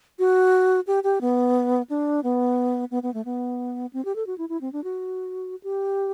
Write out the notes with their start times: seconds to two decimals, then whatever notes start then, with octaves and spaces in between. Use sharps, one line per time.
0.19 F#4
0.87 G4
1.04 G4
1.21 B3
1.90 D4
2.23 B3
2.91 B3
3.03 B3
3.14 A3
3.25 B3
3.93 C4
4.05 G4
4.16 A4
4.27 F#4
4.38 E4
4.49 E4
4.61 C4
4.73 D4
4.84 F#4
5.64 G4